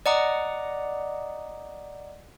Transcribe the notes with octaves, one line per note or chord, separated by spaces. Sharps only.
D5 D#5 F#5 A#5 D6 D#6